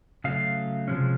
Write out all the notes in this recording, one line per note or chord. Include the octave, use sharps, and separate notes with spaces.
C#3 F#3 A3 F5
C3 F3 G#3 C#4